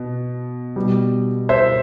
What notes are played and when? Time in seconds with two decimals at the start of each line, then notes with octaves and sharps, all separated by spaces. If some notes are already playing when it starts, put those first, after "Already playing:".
Already playing: B2
0.76 B2 G3
1.49 C5 E5